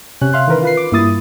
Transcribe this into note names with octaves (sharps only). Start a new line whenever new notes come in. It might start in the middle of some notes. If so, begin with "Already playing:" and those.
C3 C#4 F#6
E5 F5 C6 F#6
D#3 E3 A#4 B4
F4 B4 C7
D6
G2 A#3 E4 D#6 A6